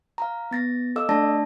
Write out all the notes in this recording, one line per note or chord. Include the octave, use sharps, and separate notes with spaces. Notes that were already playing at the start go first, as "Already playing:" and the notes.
F5 A#5
B3 A6 A#6
A4 D#5 F5 D6 E6
A3 D4 D5 A5 A#6